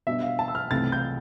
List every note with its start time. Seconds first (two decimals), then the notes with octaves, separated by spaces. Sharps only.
0.07 B2 G3 D4 E5
0.22 F5
0.39 A5
0.48 E6
0.55 F6
0.71 C2 C3 E3 A3 A6
0.92 G6